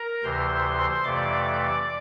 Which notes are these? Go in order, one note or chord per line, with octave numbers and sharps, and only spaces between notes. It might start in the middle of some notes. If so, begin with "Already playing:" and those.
Already playing: A#4 A#5
D2 C3 E3 C5 C6
F2 C3 E3 A3 D5 D6